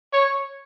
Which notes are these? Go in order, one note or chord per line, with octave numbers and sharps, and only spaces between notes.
C#5